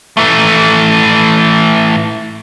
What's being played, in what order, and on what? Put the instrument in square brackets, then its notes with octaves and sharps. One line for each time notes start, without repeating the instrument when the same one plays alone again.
[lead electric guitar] E3 A3